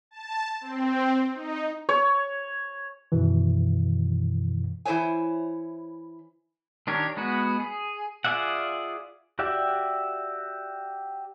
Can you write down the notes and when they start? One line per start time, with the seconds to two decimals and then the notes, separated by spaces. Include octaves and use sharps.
0.11 A5
0.61 C4
1.35 D#4
1.89 C#5
3.12 F#2 B2 D#3 E3
4.85 E3 E4 G#4 C5 C#5 G#5
6.87 D#3 D4 G4 A#4 C#5
7.17 G#3 B3 F#4
7.60 G#4
8.25 F4 G#4 D5 E5 F#5
9.39 F#4 G4 D5 E5